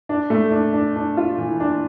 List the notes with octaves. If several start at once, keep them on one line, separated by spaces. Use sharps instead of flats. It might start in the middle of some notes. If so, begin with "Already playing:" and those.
D4
A3
D4
D4
D4
F4
E3
D4